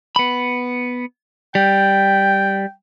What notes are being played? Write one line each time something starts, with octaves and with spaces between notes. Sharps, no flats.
B3 B5
G3 G5